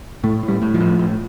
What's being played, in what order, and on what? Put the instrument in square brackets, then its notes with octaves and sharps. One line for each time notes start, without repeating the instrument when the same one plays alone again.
[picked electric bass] A2 A3
A2
G3
A2
F3
A2
A2